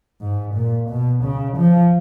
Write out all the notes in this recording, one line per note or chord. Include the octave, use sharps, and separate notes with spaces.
G#2
A#2
B2
C#3
F3